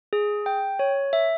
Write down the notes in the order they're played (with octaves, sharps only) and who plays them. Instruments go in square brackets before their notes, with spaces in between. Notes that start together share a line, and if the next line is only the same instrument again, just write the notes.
[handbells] G#4
G5
C#5
E5